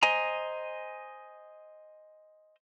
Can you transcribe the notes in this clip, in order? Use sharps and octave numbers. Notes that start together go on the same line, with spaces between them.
C5 D#5 G#5 A#5